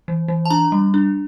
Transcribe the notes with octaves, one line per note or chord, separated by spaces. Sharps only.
E3
E3
A5
D4 A#5
G3
D4